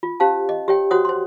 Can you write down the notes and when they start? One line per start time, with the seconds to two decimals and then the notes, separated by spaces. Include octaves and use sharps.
0.03 F4
0.20 C#4 G4 C5 F5 A5
0.49 D#5
0.68 G4 C#5 G5
0.91 F#4 C5 C#5 F#5 D#6
1.05 C5 C6